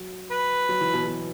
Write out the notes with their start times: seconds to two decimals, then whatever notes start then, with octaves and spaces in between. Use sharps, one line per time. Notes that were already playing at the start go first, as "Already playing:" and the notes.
Already playing: F#3
0.31 B4
0.69 F#3
0.81 E3
0.94 B2
1.06 B2